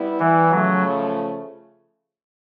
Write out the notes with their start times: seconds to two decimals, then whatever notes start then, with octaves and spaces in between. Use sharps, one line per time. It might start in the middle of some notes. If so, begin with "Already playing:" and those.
Already playing: G3 B3 E4
0.20 E3
0.51 C#3 F3 F#3 A3